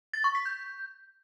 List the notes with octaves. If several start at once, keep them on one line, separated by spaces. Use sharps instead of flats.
A6
C#6
B6
G6